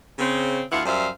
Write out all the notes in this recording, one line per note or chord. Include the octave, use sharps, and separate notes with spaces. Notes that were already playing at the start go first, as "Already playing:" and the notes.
C#3 C4
D2 E4 F4 F5 F#5
F#2 G3 C5 E5 F5